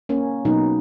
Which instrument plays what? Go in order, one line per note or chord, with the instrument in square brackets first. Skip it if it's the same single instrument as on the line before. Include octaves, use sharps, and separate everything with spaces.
[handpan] A#3 C#4
B2 F#3 A#3 B3 D#4